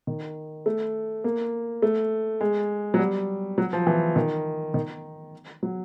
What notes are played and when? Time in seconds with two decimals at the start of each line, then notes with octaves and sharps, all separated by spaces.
0.07 D#3
0.66 A3
1.24 A#3
1.82 A3
2.41 G#3
2.94 F#3
2.99 G3
3.58 F#3
3.73 F3
3.87 E3
4.16 D#3
4.74 D#3
5.63 F#3